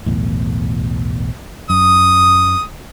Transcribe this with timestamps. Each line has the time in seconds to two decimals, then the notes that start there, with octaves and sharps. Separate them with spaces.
0.06 B1 E2 A2
1.70 F#2 D#6